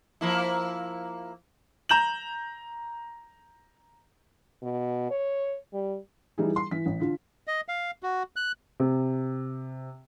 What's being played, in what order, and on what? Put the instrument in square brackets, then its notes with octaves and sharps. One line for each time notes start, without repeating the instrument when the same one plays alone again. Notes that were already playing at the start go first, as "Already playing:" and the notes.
[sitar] F3 A#3 E4
[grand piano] A#5 G6 E7 F#7
[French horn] B2
C#5
G3
[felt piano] E3 G3 D#4 G#4
C6
E3 B6
A1
D3 F4
[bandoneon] D#5
F5
F#4
F#6
[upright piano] C3